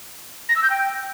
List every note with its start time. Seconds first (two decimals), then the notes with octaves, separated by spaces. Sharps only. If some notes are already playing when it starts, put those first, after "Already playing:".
0.49 A#6
0.56 E6
0.63 G6
0.70 G5